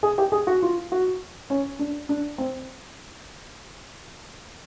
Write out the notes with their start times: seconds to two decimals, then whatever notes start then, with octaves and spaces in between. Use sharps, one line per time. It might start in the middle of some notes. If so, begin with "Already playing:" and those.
0.03 G#4
0.18 G4
0.32 G#4
0.47 F#4
0.62 F4
0.92 F#4
1.50 C#4
1.79 D4
2.09 D4
2.38 C4